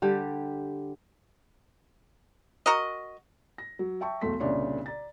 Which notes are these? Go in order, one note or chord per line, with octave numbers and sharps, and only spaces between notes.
D3 G3 G4
F#4 A#4 D#5
A#6
F#3
E5 G5 A5 C#6
B1 E2 A3 C6 B6
C2 A#2 C#3 D4 C#5 C6
D5 A#5 A6